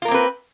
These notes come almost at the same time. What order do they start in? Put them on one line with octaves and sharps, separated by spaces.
F4 A#4 A#3 C4 B4